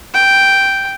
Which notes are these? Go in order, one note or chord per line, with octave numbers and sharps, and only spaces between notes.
G5